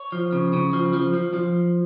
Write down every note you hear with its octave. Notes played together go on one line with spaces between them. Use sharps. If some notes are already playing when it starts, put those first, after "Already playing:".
Already playing: C#5
F3
C#3
C#3
F3
F3
F3
F3